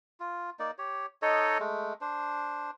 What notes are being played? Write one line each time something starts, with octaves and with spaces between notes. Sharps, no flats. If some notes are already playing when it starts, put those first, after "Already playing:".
F4
A#3 D#4 D5
G4 C#5
D#4 A4 C#5 D#5
G#3 A3
D4 C5